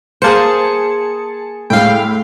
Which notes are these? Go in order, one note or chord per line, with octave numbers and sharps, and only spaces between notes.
A#3 G#4 C5 A5 C#7
A2 G#3 F5 G5